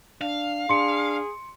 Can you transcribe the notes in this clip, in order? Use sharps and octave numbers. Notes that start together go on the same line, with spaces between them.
D4 F5
D4 G#4 C6 C#7